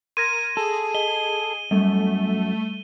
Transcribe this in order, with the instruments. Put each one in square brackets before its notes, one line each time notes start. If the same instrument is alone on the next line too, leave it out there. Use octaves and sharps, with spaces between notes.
[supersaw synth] A#4 [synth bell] C6 G#6 A#6 [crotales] D#7
[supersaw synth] G#4 [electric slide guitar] A4
[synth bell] D#5 [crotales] G7
[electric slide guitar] F#2 [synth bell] G3 [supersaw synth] A3